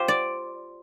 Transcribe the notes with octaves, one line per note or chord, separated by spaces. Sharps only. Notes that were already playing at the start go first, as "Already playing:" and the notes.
Already playing: F4 G4 C5
D5